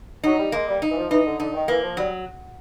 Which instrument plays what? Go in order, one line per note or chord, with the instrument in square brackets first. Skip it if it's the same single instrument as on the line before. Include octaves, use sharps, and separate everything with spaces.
[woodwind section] F#3 [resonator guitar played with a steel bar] D#4
[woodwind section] G3
[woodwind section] G#3 [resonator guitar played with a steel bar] A#3
[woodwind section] G3
[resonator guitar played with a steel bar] D#4
[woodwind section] E3
F3
[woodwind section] E3 [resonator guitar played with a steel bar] D#4
[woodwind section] D3
[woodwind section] D3 [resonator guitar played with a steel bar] D#4
[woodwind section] D#3
[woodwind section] E3 [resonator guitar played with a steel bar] A#3
[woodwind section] F3
[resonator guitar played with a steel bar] F#3 [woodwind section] G3